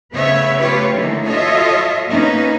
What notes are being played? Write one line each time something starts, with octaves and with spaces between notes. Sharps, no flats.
C#3 A3 B3 B4 C#5 E5
A3 F4 G4 B4 C#5
D3 E3 A3 A#3 D#4
F4 F#4 A4 C#5 D#5 E5
A#3 B3 C#4 D#4 B4